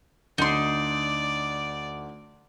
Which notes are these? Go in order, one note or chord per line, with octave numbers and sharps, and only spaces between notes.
D2 D#4 D5 C6